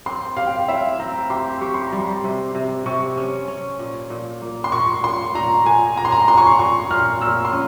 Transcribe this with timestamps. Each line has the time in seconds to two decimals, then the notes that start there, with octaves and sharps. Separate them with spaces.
0.06 C4 C6
0.37 G4 F5
0.46 G5
0.56 F5
0.68 E4 E5
1.00 C4 A#5
1.30 G4 C6
1.61 G4 C#6
1.74 C6
1.87 A#5
1.92 G3
1.99 C6
2.24 C3
2.55 C3
2.86 C3 C#6
3.17 C#4
3.48 C#4
3.79 A#2
4.10 A#2
4.42 A#3
4.64 C6
4.72 A#2 C#6
5.03 A#2 C6
5.35 A#2 A#5
5.66 A#2 G#5
5.97 A#2 A#5
6.05 C6
6.12 A#5
6.28 A#2 C6
6.37 C#6
6.47 C6
6.59 A#2 C#6
6.91 A#2 F6
7.21 A#2 E6
7.45 C6
7.52 C#4